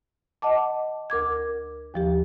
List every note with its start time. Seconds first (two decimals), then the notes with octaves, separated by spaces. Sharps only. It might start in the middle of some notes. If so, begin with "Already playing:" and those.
0.42 D#5 F#5 A5 D6
1.10 D2 A#4 D6 G#6
1.94 D#2 F3 G4